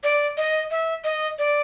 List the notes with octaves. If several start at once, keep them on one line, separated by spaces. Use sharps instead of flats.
D5
D#5
E5
D#5
D5